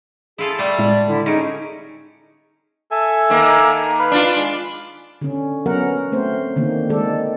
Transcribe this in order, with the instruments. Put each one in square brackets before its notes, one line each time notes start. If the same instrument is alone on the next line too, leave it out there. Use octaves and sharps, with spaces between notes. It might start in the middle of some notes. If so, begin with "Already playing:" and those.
[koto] E4 F4 A4 [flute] G#4
[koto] G3 A3 [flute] D5
[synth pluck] A2 G#3 [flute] D5
[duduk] D3 [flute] E4
[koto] C#4 [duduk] D#4 [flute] G#4 [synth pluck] A#6 C#7 D7
[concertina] A4 E5 G#5
[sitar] D#3 A#3
[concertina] B4 F5 B5
[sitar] D4 F4
[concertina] G#3
[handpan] D3 C#4
F#3 B3 C#4 A#4 F#5
A3 C4 C5
D3 D#3 A#3
D#3 G#3 A4 D5